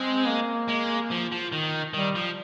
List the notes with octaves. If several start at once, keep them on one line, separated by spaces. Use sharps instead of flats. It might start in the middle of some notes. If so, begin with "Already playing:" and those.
Already playing: G#3 C4
A#3
G#3
F3
F3
D#3
D#3 G3
F3